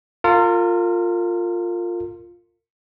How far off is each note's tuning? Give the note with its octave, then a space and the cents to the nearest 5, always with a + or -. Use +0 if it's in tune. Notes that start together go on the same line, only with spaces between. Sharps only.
F4 +5 A#4 -35